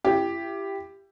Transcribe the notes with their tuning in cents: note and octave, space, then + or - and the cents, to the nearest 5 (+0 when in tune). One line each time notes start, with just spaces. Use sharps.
E4 +35 G4 +5